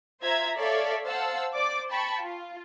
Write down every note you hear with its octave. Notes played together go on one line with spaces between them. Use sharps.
F4 C5 E5 A#5 G#6
A4 C#5 D5 E5 F5
C5 F5 F#5 A5 E6
C5 D5 D6
G5 A5 B5 C#6
F4